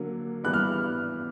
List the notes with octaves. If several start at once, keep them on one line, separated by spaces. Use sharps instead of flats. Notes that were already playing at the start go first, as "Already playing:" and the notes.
Already playing: D3 F#3 A#3
E3 G3 B3 F#6
F6